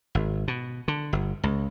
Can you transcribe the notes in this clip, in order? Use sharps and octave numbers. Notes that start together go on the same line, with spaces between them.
G#1
B2
D3
G1
C#2